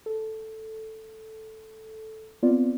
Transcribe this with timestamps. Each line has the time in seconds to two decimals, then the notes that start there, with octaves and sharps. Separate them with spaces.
0.06 A4
2.43 B3 C4 F4 D5